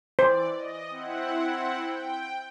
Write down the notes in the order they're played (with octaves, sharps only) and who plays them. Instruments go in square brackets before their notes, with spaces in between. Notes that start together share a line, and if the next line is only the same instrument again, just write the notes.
[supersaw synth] E3 D5 [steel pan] C5
[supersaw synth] D#5
C4 E4 F#5
G5